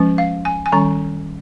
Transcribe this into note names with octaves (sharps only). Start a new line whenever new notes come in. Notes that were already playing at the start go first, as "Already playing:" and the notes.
Already playing: F3 G#3 C#4
F5
G#5
G#5
D#3 G3 C#4 A#5